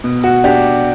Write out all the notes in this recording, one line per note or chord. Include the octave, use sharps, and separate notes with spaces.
B2
F#4
D4 G4